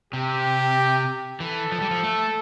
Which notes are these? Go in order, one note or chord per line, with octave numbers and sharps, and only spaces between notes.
C3 G4
E3 A4
F3
G3
F3
A3